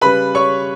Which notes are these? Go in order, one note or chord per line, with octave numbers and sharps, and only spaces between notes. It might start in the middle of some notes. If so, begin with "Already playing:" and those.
C#3 G3 B4 B5
C#5 C#6